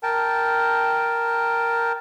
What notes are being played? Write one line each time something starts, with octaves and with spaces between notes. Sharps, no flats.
A#4 G5 A5